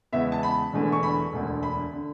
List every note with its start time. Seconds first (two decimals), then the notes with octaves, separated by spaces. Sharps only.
0.12 E2 C#3 G#3 B3 E5
0.32 A5
0.43 B5
0.73 E1 E2 D3 A3
0.92 C#6
1.03 B5
1.33 E1 D2 D3
1.63 B5
1.93 D3